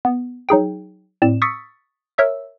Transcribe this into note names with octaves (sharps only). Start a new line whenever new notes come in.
B3
F#3 D#4 G#4 G5
A2 C4 D5 E7
C#6 D#6 E6 A6 B6 C#7
A#4 C#5 E5 E6